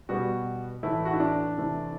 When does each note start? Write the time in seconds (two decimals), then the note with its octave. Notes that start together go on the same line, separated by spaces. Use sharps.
0.09 B2 G3 B3 F#4
0.83 A2 E3 A3 E4
1.05 F#4
1.13 E4
1.20 D4
1.57 C3 E3 A3